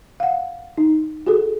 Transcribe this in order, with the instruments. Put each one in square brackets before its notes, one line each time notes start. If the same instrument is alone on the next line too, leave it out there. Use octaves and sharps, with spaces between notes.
[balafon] F5 F#5
D#4
F#4 G#4 A4